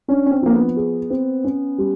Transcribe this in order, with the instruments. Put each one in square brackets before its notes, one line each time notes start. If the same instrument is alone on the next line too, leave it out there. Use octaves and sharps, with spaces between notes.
[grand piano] C#4 [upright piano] D4
[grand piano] C#4
C4
[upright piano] F3 [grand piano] A#3
[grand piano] B3
[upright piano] G#4
C4
C#4
G3